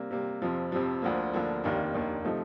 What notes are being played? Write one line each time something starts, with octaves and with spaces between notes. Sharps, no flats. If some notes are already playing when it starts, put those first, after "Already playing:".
Already playing: C3 G3 A#3
C3 G3 A#3
F2 C3 F3
F2 C3 F3
D2 D3 F3 A#3
D2 D3 F3 A#3
F1 D#2 D#3 A#3 D4
F1 D#2 D#3 A#3 D4
C3 F3 A3 D#4